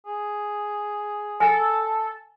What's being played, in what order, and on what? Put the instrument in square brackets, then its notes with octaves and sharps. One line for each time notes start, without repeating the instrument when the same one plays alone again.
[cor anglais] G#4
[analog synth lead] A4 [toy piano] G#5